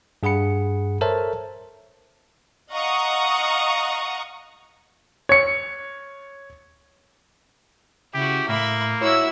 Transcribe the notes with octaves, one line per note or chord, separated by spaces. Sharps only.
G2 G#4 F#5 B5 C#7
A4 A#4 C5 C#5 E5 A5
D#5 F5 F#5 A#5 C#6 D#6
C#5 C#7
C#3 E4 F#4 G4
A2 A#3 E5 B5
E4 F#4 C#5 E5 E6